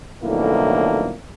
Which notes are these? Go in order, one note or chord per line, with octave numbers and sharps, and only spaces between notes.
B1 F2 A2 D3 A#3 E4